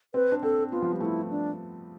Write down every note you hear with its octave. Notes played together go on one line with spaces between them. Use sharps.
C4 B4
D4
C4 A4
B3 F4
F3
G3
A3 E4
D4